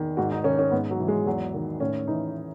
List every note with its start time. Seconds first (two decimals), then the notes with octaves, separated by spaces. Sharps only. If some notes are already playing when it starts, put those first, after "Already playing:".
Already playing: E2 D#3
0.17 G#2 F#4
0.32 D#4
0.44 D#3 C#4
0.59 C#4
0.72 G#2 B3
0.91 F#3
1.00 E3
1.08 G#3
1.26 E2 F#3
1.54 D#3
1.80 A2 C#4
2.07 E3 D#4